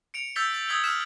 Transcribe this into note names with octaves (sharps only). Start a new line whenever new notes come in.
C#7 D7 F7
E6 G6 A6 B6 F7 G7
A6
D#6 E6 G#6 B6 F#7 G7
E6 F6 B6 E7